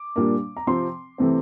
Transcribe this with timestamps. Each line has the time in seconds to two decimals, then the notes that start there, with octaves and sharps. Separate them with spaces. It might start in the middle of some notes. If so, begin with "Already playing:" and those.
Already playing: D6
0.16 A#2 G3 A#3 D4
0.57 A#5
0.67 C3 F3 C4 C6
1.18 C3 E3 A3 C4